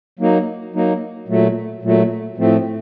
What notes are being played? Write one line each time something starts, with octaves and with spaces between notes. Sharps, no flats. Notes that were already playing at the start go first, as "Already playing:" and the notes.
F#3 A#3 D#4
F#3 A#3 D#4
A#2 F#3 A3
A#2 F#3 A3
A2 F3 A3 C4